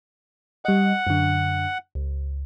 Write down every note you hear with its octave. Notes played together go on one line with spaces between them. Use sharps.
G3 D#5 F#5
F#2 D3
C#2